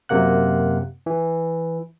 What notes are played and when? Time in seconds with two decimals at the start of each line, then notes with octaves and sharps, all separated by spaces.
0.09 F#2 C3 A#3 F#5 F#6
1.06 E3